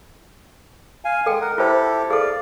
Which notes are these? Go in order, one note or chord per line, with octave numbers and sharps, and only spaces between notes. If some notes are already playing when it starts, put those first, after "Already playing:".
F5 G#5
G#3 A4 G5
A#4 F#5
E4 F4 G4 A4 C5
G#4 A4 D5 F5